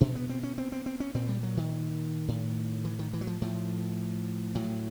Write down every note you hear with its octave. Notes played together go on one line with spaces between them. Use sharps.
B2 D4
B3
C4
C#4
C4
C4
C4
C#4
A#2 C4
G3
F#3
D#3
A2
E3
D#3
E3
F#3
F3
A2 F3
A2 F#3